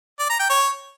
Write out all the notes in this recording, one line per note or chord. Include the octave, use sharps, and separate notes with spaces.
D5
A#5
G5
C#5